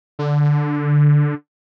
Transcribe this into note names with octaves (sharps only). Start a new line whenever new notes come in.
D3